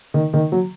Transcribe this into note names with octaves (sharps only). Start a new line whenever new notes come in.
D#3
D#3
F#3